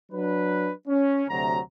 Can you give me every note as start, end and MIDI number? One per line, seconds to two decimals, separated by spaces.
0.12 0.71 54
0.12 0.71 62
0.12 0.71 71
0.88 1.25 61
1.30 1.59 38
1.30 1.59 48
1.30 1.59 54
1.30 1.59 82